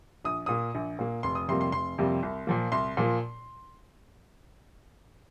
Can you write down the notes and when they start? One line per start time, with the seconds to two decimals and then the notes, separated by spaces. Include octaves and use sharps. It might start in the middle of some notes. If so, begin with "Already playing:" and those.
0.25 A#1 D#6
0.46 A#2 A#3 D#6
0.75 A#1
0.99 A#2 A#3
1.23 F1 C6
1.35 D#6
1.48 F2 C3 G3 A#3 C6
1.61 C6
1.72 F1 C6
1.98 F2 C3 G3 A#3
2.23 C2
2.47 A#2 F3 A#3
2.72 C2 C6
2.97 A#2 F3 A#3